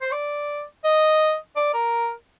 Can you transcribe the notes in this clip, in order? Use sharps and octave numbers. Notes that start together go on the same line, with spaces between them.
C5
D5
D#5
D5
A#4